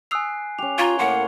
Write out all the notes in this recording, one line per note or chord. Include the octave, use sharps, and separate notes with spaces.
G#5 D#6 E6 F#6 C7 F7
C#4 G4 F7
F4 F5 A#5 C#6 G#6 G7
A2 A#3 F#5 C6